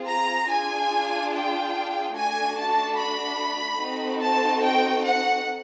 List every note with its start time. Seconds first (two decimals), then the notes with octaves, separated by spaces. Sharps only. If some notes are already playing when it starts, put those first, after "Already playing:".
Already playing: C4 F4 G#4
0.08 A#5
0.50 D4 F4 G#4 G#5
1.32 G5
2.16 A3 D4 F#4 G#5
2.57 A5
2.98 B5
3.81 C4 D#4 F#4 A4
4.23 A5
4.64 G5
5.05 F#5